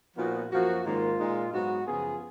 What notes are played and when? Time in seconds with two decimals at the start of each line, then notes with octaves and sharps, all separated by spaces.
0.16 A#2 F3 B3 D#4 F#4
0.51 F#2 F3 A#3 F#4
0.84 G#2 D#3 A#3 C#4 F4
1.18 A#2 G#3 D#4
1.52 G#2 F#3 B3 D#4 F#4
1.86 F#2 C#3 F3 B3 F4 G#4